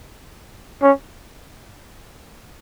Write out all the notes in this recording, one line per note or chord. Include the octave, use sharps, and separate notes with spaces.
C#4